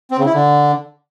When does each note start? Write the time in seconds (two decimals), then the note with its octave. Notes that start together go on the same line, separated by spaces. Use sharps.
0.11 C4
0.18 C#3
0.26 E4
0.33 D3